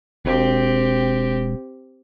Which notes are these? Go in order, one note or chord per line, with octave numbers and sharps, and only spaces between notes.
E1 C4 G4